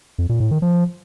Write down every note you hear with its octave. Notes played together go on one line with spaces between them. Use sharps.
F2
A#2
A2
D#3
F3